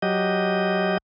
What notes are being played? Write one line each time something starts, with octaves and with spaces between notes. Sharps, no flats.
F#3 G4 D#5